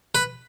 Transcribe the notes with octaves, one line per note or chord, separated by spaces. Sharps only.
B4